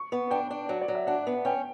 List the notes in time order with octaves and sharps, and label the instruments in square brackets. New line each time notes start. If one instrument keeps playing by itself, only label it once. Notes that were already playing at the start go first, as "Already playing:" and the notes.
Already playing: [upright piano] C#6
[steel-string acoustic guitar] B3
[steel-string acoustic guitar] D4 [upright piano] G5
[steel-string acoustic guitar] D4
[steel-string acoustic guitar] F#3 [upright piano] D5
[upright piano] D5
[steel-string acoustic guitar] F#3
[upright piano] E5
[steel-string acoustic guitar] D4 [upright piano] F#5
[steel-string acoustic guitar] B3
[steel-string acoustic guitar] C#4 [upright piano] G5